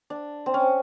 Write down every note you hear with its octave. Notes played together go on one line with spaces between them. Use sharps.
D4
C4
C#4